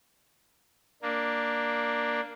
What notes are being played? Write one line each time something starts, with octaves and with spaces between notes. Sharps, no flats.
A#3 D4